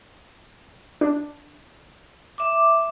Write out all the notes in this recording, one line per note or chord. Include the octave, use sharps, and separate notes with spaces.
D4
E5 D6